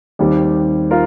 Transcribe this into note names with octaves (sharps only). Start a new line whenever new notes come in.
D#2 D#3 G3 C4 G4
F4 A#4